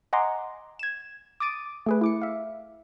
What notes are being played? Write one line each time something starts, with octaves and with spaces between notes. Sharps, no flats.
D#5 F#5 G#5 A#5 C6 D6
G#6 E7
D6 D#6 A6 D7 D#7
A3 G#4 B4
E4 D6 C#7
E5 F5